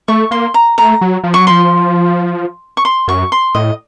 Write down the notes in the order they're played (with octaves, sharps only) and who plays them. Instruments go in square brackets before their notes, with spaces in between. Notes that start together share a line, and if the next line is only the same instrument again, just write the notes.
[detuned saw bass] A3 [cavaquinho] C#6
[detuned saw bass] A#3 [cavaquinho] C6
[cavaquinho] A#5
[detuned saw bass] A3 [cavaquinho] A#5
[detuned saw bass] F#3
F3
[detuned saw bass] F#3 [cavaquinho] C#6
[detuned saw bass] F3 [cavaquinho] C6
[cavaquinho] C#6
C6
[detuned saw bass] F#2 [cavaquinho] C#6
[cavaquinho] C6
[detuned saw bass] A2 [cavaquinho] D#5